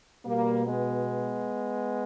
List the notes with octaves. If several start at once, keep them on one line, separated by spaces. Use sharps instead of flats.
B2 G3 A#3
G#3 B3